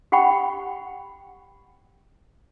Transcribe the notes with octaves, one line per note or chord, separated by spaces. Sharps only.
G4 F#5 G5 B5 C#6